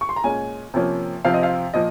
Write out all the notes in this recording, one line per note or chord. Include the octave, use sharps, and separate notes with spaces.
C#6
C6
A#5
A#2 G#3 C#4 G#5
C3 F3 A#3 C#4
C3 F3 C4 F5
D#5
F5
A#2 F3 D#5